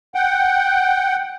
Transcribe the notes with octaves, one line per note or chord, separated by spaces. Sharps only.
F#5 G5